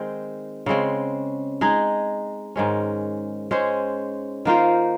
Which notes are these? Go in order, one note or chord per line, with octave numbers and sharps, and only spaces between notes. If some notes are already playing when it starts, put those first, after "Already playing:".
Already playing: D#3 G#3 C4
C#3 G#3 C4
G#3 D#4 G#4
G#2 D#3 G#3 C#4
G#3 C#4 G#4 C5
D#3 A#3 F4 C5